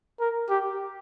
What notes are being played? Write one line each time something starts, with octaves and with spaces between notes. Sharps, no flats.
A#4
G4